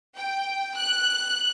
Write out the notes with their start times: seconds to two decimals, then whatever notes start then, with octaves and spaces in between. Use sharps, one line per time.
0.15 G5
0.75 F#6